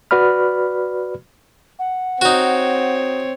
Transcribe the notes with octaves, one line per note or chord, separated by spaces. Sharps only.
F#4 B4 D5 B5 F6
F#5
C4 D#4 F#4 C#5